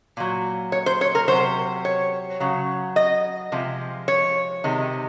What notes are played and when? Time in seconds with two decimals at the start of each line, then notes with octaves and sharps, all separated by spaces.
0.17 A#2 F#3
0.72 C#5
0.86 C5
1.01 C#5
1.15 A#4
1.28 C3 F#3 C5
1.85 C#5
2.40 C#3 F#3
2.96 D#5
3.52 C3 F3 G#3
4.08 C#5
4.64 C3 D#3 G#3